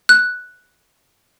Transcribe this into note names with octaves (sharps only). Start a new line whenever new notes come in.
F#6